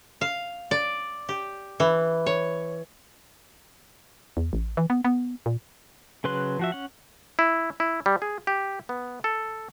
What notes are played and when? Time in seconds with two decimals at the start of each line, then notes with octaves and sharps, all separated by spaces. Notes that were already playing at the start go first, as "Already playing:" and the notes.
0.21 F5
0.71 D5
1.29 G4
1.80 E3
2.26 C#5
4.37 E2
4.53 A1
4.77 E3
4.90 B3
5.05 B3
5.46 A#2
6.24 C#3 F#3 B4 C6 F#6
6.59 F3 F#4 E5
6.72 C#4 F#5
7.39 E4
7.80 E4
8.06 G3
8.22 G#4
8.47 G4
8.89 B3
9.24 A4